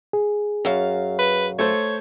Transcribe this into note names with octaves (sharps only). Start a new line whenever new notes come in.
G#4
F#2 F5
B4
A3 A4 C5 C#5